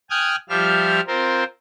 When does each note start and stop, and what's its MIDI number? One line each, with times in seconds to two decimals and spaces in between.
0.10 0.36 79
0.10 0.36 80
0.10 0.36 87
0.10 0.36 89
0.10 0.36 90
0.10 0.36 92
0.49 1.01 53
0.49 1.01 55
0.49 1.01 65
0.49 1.01 67
0.49 1.01 76
0.49 1.01 89
1.07 1.44 60
1.07 1.44 65
1.07 1.44 70
1.07 1.44 72